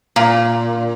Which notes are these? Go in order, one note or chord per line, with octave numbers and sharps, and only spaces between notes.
A#2